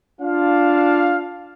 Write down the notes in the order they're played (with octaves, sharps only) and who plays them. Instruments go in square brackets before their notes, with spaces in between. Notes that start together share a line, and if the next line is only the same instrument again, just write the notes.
[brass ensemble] D4 F4 F5